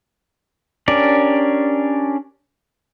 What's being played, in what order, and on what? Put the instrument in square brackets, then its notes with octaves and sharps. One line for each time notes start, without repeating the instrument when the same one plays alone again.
[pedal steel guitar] C#4 D4 G4 A#4 D5